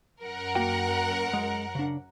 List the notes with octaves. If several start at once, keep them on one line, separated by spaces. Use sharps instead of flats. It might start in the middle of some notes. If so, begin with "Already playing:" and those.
F#2 A#4 F#5
A#3 F#4 G5
G#3
C#3 D4